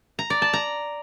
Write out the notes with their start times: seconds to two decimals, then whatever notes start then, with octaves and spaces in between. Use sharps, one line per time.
0.19 A#5
0.30 D5
0.42 A5
0.53 A#5